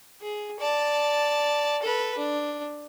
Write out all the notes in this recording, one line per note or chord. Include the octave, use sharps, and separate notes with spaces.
G#4
D5 A5
A4 B4
D4